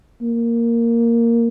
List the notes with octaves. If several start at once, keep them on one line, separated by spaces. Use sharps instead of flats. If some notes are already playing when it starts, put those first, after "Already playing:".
A#3